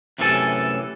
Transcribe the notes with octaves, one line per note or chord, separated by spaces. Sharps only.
F#2 A2 C3 E3 A4 G#5